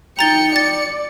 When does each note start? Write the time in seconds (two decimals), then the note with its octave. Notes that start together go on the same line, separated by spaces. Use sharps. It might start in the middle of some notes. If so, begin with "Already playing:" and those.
0.19 D#4 G5 A#5 A6 C#7 G7
0.56 D5 A6